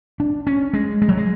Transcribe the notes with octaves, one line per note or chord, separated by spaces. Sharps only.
D4
C#4
G#3
G#3
F#3
G#3